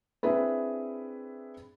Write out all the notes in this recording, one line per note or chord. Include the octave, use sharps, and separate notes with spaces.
C4 D4 E4 G#4 B4